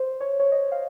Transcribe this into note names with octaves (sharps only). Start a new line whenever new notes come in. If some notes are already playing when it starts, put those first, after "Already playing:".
Already playing: C5
C#5
C#5
D#5
F5